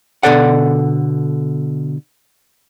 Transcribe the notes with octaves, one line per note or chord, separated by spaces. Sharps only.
B2 D3 A4 D5 F#5